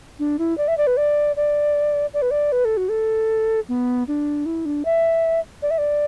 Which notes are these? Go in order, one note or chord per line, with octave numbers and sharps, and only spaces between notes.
D4
E4
D5
E5
D5
B4
D5
D5
D5
B4
D5
B4
A4
F#4
A4
B3
D4
E4
D4
E5
D5
E5
D5